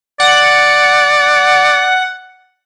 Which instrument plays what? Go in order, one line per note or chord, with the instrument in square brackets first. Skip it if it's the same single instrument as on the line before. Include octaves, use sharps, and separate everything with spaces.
[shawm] D5 [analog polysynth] F#5